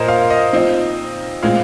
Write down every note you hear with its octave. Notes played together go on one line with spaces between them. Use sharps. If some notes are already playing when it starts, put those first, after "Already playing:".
Already playing: A#2 F3 A#3 F4 A#4 C5 D#5
F5
D#5
F3 C4 D#4
A#2 G#3 C4 F5